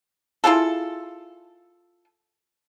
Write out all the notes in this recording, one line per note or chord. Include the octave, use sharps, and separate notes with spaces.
E4 F4 G#4 A4